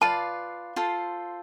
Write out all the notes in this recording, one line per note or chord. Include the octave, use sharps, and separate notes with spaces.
F4 B4 D5 F5 A5
F4 A4 C5